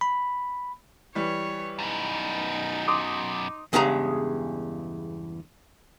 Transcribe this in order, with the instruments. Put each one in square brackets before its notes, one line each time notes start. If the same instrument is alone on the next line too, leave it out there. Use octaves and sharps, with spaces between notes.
[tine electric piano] B5
[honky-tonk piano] E3 G3 [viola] C#5
[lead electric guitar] F#2 B2 [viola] D#4
[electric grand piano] C6 D6 D#6
[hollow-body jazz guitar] E2 G2 C#3 G#3 G#4 A#5